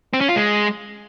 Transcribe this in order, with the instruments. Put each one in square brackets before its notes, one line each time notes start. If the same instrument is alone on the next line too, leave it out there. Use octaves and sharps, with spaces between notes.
[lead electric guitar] C4
C#4
F4
G#3